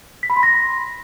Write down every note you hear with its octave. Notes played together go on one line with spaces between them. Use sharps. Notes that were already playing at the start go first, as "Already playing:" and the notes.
B6
B5
C6
A#6